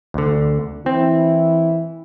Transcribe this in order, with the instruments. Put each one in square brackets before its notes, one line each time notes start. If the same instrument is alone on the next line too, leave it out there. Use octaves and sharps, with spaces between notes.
[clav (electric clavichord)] D2 D3
[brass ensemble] E3 E4 [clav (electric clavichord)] C4